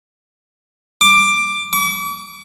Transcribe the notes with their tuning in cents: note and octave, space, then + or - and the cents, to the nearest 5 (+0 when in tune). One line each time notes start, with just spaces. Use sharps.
D6 +10
D6 -45